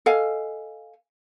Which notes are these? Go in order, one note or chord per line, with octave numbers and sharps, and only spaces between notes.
A4 D#5 F5 G#5